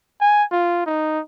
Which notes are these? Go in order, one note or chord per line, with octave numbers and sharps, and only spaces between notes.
G#5
F4
D#4